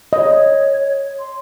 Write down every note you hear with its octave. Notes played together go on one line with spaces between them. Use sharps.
C#5 D#5
C6